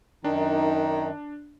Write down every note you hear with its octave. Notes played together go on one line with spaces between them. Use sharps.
F#2 D#3 D4 D#4